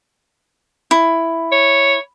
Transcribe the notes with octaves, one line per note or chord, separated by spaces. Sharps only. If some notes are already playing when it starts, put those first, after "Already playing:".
E4
C#5